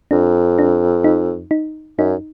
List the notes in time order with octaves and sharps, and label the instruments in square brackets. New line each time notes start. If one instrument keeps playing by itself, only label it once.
[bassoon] F2 [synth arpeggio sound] D4
[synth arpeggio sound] D4
D#4
D#4
[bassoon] F#2 [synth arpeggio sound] D#4